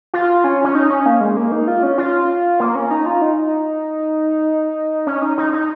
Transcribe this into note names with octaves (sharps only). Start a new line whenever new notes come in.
F4
C#4
C#4
D#4
C#4
A#3
G#3
A#3
D#4
F4
C#4
F4
A#3
C#4
D#4
F4
D#4
C#4
D#4
D#4
D#4